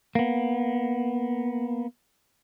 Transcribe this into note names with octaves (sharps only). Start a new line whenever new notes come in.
A#3 B3